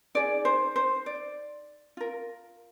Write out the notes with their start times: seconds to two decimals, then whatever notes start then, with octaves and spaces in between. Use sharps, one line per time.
0.15 D#4 G#4 D5
0.45 C5
0.76 C5
1.06 D5
1.97 F4 A#4